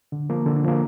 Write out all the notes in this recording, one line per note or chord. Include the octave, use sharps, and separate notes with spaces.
D3
F3 A#3
D3
F3 A#3